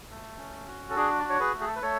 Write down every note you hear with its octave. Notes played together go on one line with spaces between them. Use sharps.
A3
C#4
F#4
A4
D4 G#4
D5
F#4
C#5
G#4 B4
A3
G#4
A4
B4
A3 A4 C#5